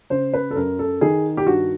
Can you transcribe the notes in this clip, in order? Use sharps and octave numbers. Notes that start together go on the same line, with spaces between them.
C#3 C5
B4
A4
F#2 A#4
A4
D#3 G#4
G4
G2 F#4